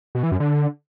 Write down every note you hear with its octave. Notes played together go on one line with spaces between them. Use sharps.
B2
E3
F#2
D3